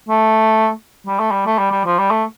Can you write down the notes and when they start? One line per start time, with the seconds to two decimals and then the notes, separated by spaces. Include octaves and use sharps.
0.09 A3
1.07 G3
1.20 A3
1.31 G3
1.46 A3
1.59 G3
1.71 G3
1.85 F3
1.99 G3
2.11 A3